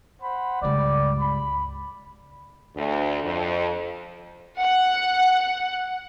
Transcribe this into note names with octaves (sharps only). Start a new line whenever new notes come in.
C5 F#5 B5
C#2 G2 G3 D5
B5
D2
F2
F#5